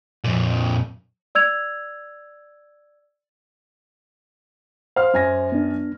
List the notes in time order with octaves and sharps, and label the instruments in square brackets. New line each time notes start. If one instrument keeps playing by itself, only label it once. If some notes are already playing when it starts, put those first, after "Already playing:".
[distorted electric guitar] F2 A#2
[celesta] D5 E6 G#6 F7
[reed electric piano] C5 [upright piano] F5 F6
[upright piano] F#2 G#5 A#6
[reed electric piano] B3 D4